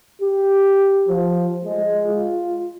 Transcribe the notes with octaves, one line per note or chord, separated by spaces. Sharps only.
G4
F3
G#3
F4